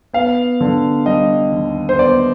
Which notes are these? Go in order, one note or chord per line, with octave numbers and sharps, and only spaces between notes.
B3 F5
D3
G3 D#5
D#2
C5
B3 D5